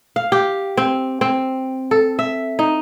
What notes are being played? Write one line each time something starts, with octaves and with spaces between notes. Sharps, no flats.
F5
G4
C4
C4
A4
E5
D#4